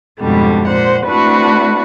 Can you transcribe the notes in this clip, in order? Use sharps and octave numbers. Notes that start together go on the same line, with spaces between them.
F2 G#2 B2 D3 G3
A#2 C5 F#5
A3 C4 D4 E4 F#4 B4